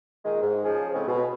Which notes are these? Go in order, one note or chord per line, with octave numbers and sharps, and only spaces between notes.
A#2 D#3 G#3
G#2
C#3 F3 G#4
A2 C#3 G#3 C4 C#4
B2